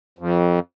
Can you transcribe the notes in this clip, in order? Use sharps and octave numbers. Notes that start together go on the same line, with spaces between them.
F2